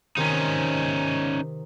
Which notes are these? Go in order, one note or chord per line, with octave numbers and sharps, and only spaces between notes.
C3 D#3 C#4 D#4